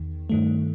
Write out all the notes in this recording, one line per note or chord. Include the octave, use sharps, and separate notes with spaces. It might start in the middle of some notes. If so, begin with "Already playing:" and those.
Already playing: E2 D#3
G2 D#3 A3